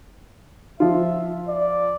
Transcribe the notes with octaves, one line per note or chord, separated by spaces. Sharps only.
F3 F4 E5
D5